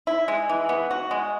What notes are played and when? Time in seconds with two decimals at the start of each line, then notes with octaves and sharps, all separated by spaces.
0.07 E4
0.28 G#3
0.49 E3
0.69 B3
0.91 F#4
1.11 G#3